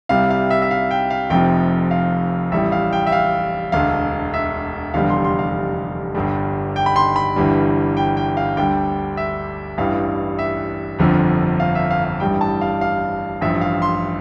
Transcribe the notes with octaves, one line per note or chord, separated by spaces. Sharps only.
C2 C3 G3 F5
F5
E5
E5
F5
G5
F5
F1 F2 C3 F3 G5
F5
A1 A2 G3 E5
F5
G5
E5
F5
E1 D2 D3 F5
E5
F1 E2 D3 G3 F5
C6
C6
F5
G1 G2 D3 G3
G5
B5
C6
B5
G1 G2 E3 G3
G5
G5
F5
D2 D3 G3 G5
E5
A1 G2 E3 G3 F5
E5
G1 F2 D3 F3
F5
E5
F5
F5
A1 G2 E3 G3 G5
A5
F5
F5
A1 G2 F3 E5
F5
C6